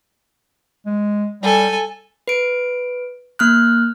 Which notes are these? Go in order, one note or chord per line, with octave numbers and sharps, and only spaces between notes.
G#3
G3 A4 G#5
B4 D7
A#3 F6 F#6